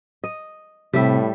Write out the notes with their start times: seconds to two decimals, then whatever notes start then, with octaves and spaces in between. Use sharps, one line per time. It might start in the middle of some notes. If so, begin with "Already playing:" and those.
0.24 D#5
0.93 A2 C3 G3 E5